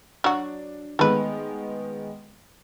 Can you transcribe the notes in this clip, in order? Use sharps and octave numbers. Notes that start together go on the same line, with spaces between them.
F#3 D4 F#4
D#3 G#3 A3 B3 B4